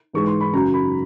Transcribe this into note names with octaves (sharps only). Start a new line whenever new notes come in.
G#2 E3 G#3 C#6
C6
B5
F#2 C#3 F#3 A#5
B5